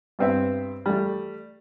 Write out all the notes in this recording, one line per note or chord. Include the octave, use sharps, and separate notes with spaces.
G2 B3 C4 C5 E5
G3 A3